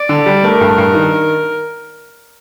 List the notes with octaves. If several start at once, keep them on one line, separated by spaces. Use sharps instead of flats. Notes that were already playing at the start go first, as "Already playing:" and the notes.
Already playing: D5
D3
G3
A3 A#4
G2
G2
D#3